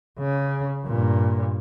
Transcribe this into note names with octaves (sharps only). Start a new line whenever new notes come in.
C#3
G2 A#2